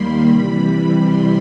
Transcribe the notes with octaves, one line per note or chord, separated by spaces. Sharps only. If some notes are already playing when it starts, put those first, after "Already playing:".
Already playing: D#2 D#3 G3 A#3 B5 C6
C3 E3 G3 B5
B5
C6